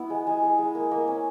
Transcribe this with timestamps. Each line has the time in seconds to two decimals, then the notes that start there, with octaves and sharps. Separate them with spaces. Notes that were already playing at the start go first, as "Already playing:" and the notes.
Already playing: B3 E4
0.10 G#3
0.27 G#3
0.43 G#3
0.58 G#3
0.75 A#3
0.91 A#3
1.08 C#4